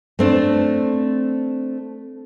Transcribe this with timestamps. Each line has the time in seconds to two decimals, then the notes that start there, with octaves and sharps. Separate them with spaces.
0.19 A3 C4 D4